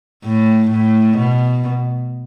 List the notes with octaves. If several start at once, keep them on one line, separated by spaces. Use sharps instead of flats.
A2
A2
B2